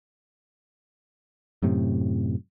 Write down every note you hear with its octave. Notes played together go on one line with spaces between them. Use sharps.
F#2 A2 C3